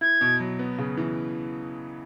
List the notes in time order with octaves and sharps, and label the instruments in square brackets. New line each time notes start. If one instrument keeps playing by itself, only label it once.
[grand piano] E4 [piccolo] G#6
[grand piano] B2
F#3
B3
C#3
E3